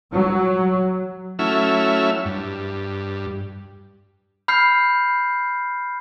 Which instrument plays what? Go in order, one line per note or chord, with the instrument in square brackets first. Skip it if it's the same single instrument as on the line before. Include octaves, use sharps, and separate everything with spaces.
[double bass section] F#3
[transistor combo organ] F#3 A3 C#4 E4 E5 F6
G2
[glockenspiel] B5 F6 G6 C7